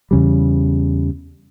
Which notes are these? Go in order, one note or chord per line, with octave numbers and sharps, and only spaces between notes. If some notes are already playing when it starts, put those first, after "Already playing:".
E2 C#3 G3